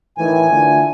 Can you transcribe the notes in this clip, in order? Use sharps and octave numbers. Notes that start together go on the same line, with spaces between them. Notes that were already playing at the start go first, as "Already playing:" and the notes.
A2 D#3 E3 G#5
D3 A3 F4